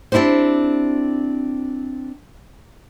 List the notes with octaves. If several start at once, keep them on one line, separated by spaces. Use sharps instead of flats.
C4 D4 E4 F#4 G4 C5